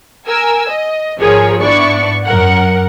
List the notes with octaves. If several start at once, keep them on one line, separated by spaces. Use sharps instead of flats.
A#4 G#5 E6
D#5
G#1 F3 G#4 A#4 C#5
G#2 B3 D4 E4 D5 C#6
F#2 A#4 F#5